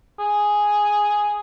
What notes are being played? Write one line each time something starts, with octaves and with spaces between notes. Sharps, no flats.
G#4